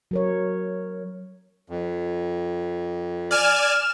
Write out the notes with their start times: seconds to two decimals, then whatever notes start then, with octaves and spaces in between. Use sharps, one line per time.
0.11 F#3 A#4 C#5
1.70 F2
3.31 D5 G#5 F6 E7